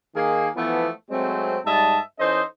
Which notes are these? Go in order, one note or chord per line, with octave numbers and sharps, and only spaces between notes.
D#3 A#3 G#4
E3 F3 A3 B3
F#3 G#3 A3 C4
G#2 G3 D#5 E5 A5
E3 C#4 D#4 A4 C5 D#5